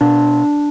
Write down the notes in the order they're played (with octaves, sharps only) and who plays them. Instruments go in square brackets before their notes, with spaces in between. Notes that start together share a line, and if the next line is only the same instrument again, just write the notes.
[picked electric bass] B2 D4